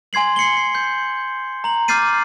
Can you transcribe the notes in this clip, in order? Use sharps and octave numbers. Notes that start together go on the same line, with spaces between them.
G#5 C6 G#6 C7 F#7
C7 C#7 F#7 G7
C7
G6
A#5 F#7
D6 F6 G6 A6 C7 D#7